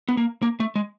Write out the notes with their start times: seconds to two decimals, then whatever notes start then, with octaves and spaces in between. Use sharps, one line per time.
0.09 B3
0.17 A#3
0.43 A#3
0.60 A3
0.76 G#3